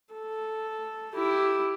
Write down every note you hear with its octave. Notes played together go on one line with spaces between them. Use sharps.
A4
E4 G4